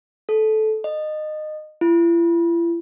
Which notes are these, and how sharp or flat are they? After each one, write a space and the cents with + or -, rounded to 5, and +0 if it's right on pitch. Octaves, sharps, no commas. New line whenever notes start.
A4 -15
D#5 -20
E4 +45